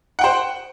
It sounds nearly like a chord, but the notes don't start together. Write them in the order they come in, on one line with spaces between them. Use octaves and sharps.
F#5 G5 C5